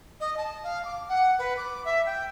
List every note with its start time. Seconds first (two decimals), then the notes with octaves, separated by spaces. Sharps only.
0.20 D#5
0.37 A5
0.63 F5
0.85 D6
1.08 F#5
1.39 B4
1.57 D6
1.85 E5
2.06 G5